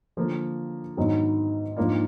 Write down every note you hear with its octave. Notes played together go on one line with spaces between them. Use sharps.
D3 F3 A#3
G#2 D#3 F#3 B3 D4
G#2 F3 A#3 D4 F4